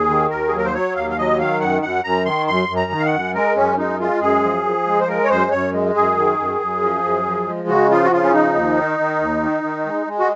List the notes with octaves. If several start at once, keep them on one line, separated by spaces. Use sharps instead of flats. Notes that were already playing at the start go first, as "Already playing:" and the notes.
Already playing: D#2 G#4
D#3
D#2 A#4
G#4
F#3 A#4
C5
F#3 C#5
D#2 F5
F5
F#3 D#5
D#3 F5
F#2 F#5
F#2 F#5
F#2 A#5
D#3 C6
F#2 C6
F#2
A#5
D#3
F5
F#5
F#2
G#3 A#4
F#2 C#4
G#3 D#4
G#3 F4
F#2 G#4
F3
F3
G#3
C5
G#3 A#4
C#5
F#2 C5
F#2 C#5
G#3
F#2 G#4
D#3
F#2
F#2
F3
F#2
F3
G#3
C#3 F#4
F3 F4
F#4
C#3 F4
C#4
F3 D#4
D#2
D#3
D#3
D#2
D#3
D#3
G#3
G#3
F#4